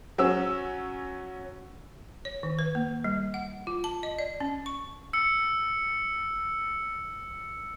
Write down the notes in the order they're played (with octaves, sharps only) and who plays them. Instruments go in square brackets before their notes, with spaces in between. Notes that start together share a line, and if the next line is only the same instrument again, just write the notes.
[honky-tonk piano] F#3 C#4 E6
[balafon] C#5
D#3
B4
A#3
G3
F#5
F4
A5
D#5
D5
C#4
C#6
[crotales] E6 C#7